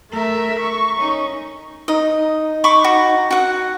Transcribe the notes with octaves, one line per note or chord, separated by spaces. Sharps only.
A3 A#4 E5
C#6
C#4 D#4
D#4 D#5
B5 C#6 D6
F#4
F#4 F#5